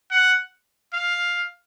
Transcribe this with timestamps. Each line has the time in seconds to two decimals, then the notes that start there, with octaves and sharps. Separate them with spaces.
0.11 F#5
0.93 F5